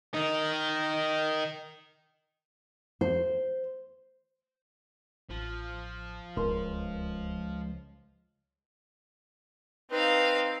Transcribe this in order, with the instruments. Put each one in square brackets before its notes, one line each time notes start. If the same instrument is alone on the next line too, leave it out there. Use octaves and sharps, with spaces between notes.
[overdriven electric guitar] D#3 D#4
[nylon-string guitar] C5
[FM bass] A1 [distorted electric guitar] F3
[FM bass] D1 [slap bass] C#2 [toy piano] A#4 B4 C6
[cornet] C4 [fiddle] D#4 F5 [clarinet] B4